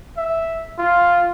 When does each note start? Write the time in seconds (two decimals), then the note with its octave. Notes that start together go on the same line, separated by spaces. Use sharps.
0.17 E5
0.79 F4